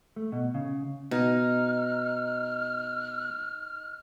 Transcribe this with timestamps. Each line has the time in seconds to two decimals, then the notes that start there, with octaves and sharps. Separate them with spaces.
0.16 A3
0.32 B2
0.54 C#3
1.11 B2 D#4 F6